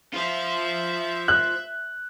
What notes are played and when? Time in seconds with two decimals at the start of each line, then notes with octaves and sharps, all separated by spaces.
0.14 F4 C5 E5
1.28 F#6